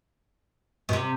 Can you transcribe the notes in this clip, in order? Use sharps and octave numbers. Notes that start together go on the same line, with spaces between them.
B2
C3